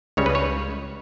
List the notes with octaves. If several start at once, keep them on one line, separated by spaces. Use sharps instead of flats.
C#2 C#3 G3 C#5
B4
C#5